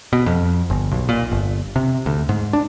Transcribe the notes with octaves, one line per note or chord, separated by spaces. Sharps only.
B2
F2
G1
B1
A#2
G1
C3
D2
G#2
D4